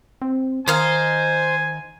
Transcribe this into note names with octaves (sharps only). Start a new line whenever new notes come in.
C4
D#3 D#4 C5 D#5 F5 G#5